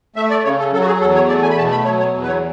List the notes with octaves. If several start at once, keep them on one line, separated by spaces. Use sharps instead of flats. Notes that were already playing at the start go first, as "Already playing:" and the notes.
A3 E5
D5
C#3 C#5
A4
F#3 A4
F#4
G#4
E2 A4
C#5
A3 D5
G#5
B5
B2 A5
B5
F#3 C#5
C#5
E2
B4
C#5